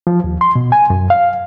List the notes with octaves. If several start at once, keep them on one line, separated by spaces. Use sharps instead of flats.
F3
D#2
C6
B2
G#5
F#2
F5